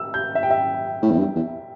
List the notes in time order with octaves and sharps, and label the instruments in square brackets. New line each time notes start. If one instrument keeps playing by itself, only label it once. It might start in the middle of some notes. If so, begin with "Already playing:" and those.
Already playing: [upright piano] E6
G6
E5
G5
E5
[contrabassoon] A2
E2
G2
E2